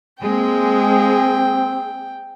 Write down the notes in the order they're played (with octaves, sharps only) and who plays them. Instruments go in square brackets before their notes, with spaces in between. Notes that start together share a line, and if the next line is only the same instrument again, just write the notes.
[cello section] G#3 A#3 [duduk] C4 [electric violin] G#4 [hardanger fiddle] G5